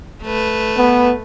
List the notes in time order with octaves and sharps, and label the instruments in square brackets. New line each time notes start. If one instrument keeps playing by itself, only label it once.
[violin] A3 B4
[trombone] B3